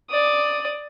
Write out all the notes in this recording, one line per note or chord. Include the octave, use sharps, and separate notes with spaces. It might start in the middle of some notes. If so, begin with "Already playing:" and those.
D5 D#6